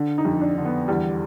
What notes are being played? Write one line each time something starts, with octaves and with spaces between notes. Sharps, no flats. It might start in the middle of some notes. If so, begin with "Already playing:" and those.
Already playing: D3
D#4
F2
D4
D3
B3
E2 G3